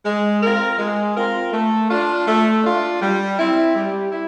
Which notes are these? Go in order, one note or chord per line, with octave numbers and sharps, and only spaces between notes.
G#3
C4 F4 A#4
G#3
C4 F4 A#4
A3
D4 F4
A3
D4 F4
G3
C4 E4
G3
E4